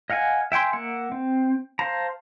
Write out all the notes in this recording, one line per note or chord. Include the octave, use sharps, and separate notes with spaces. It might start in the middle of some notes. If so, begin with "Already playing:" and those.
D#5 F5 F#5 G#5
E5 G5 G#5 C6
A#3 E5 F#5
C4
C5 F5 A5 A#5